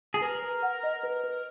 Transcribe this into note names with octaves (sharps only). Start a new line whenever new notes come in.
G#4
A#4 B4
B4
F#5
D#5
B4
B4